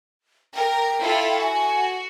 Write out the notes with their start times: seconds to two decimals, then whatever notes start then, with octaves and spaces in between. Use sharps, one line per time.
0.55 A#4 G5
1.01 E4 F4 A4
1.40 F#4 G#5